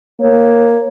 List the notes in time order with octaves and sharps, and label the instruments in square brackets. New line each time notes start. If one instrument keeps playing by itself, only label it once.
[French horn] A#3 [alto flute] C#5